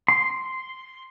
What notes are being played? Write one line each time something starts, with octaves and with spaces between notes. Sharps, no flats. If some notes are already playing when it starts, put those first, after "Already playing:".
C6